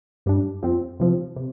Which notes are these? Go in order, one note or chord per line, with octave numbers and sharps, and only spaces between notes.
G2 G3 D4
F2 F3 C4
C3 F3 C4
C3